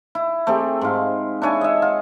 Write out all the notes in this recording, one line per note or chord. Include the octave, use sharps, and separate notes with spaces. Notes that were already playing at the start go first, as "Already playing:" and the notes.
E4
A3 C4 G4 G#4
G#2 F4
D4 E4 C#5 G#5
D#5 E5
F4